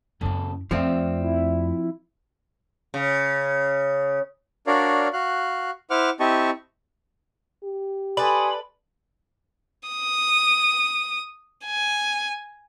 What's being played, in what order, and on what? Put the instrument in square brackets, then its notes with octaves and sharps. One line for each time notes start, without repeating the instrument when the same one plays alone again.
[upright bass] F#2 E4 [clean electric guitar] A#2 C#3 A4
[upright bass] F2 A3 [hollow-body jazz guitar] F3 C4 [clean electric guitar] C5 D5 E5
[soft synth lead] E4
[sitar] C#3
[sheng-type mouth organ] D4 F#4 A#4 C#5 D5 F5
F#4 F5 F#6
E4 C5 F#5 D6 F6
C4 E4 G4 D#5 A5 C#6
[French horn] G4
[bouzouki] A4 B4 D5 [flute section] G#5 C6 D#6 [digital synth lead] B5
[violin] D#6
G#5